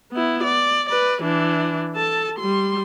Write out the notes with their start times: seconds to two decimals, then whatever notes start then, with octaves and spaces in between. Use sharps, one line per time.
0.12 B3 E4
0.44 D5
0.89 B4 D5
1.22 E3 D4
1.96 A4 A5
2.39 G3 C6